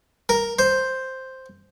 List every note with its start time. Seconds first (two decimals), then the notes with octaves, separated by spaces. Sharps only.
0.29 A#4
0.59 C5